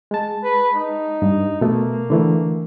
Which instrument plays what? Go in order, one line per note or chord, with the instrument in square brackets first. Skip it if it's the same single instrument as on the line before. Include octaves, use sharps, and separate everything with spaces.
[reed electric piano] G#3 A5
[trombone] B4
D#4
[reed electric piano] G2
[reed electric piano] B2 A3 [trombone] A#3
[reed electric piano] D3 E3 A3